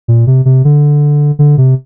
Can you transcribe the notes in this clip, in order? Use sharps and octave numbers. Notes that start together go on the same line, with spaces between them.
A#2
C3
C3
D3
D3
C3